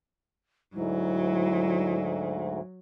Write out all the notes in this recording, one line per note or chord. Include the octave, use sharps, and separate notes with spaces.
D2 G#2 F#3 E4